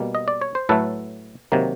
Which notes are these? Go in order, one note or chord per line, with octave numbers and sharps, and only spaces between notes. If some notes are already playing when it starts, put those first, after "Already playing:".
Already playing: B2 G3 A#3
D#5
D5
C#5
C5
A2 F#3 A3 A4 B4
C3 D#3 F#3 A#3